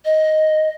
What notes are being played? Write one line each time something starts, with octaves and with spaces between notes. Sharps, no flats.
D#5